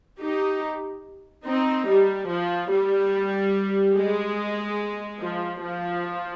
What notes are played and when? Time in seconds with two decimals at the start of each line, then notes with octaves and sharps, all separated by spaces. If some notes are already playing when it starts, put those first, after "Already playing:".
0.20 D#4 G4
1.45 C4 D#4
1.87 G3
2.28 F3
2.71 G3
3.96 G#3
5.20 F3
5.62 F3